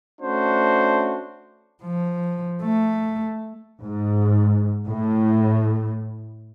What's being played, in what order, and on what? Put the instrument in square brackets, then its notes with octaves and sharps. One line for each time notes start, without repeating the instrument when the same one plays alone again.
[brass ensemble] A3 C#4 D4 F#4 C5
[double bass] F3
A3
[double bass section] G#2
A2